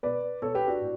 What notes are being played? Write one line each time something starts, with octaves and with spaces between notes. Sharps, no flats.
B2 B4 D5
B2 A4 C#5
G4 B4
D4 F#4
A2